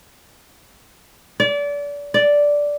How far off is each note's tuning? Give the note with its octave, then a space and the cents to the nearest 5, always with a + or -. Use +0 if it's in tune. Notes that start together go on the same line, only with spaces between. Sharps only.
D5 -30
D5 -5